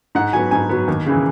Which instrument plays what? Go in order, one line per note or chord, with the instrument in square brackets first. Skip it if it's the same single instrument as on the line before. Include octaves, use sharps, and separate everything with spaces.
[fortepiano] G#2 F#5
F#3 B3 G#5
G#2 G#5
F#3 B3
D#2
C#3 E3